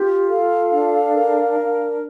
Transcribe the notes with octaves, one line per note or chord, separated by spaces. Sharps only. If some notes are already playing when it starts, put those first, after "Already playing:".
Already playing: F4 G4
A4 F5
D4
A#4
D4